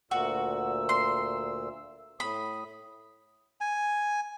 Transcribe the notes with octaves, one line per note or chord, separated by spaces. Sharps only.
D2 A#2 F#4 E6
C6
A2 B5 D#6
G#5